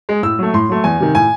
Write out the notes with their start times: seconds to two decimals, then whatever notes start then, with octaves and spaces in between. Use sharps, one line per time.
0.09 G#3
0.23 A2 E6
0.39 F#3 A3
0.54 A2 C6
0.69 F#3 A3
0.84 E2 G#5
1.00 C3 D#3
1.15 A2 G#5